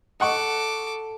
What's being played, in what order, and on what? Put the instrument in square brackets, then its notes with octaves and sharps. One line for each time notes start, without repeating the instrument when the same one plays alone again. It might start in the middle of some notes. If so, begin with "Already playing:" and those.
[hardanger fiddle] A4 D6 [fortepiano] D#5 F#5 C#6